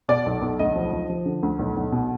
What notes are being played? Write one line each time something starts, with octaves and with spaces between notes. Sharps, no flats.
B2 D5
B1
B1
D2 D#5
F3
F3
F3
D3
D2
B1
B1
B2